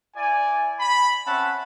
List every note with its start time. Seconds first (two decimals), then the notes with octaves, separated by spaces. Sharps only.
0.16 E4 D5 G#5
0.79 B5
1.27 C4 C#4 E5 F#5 A5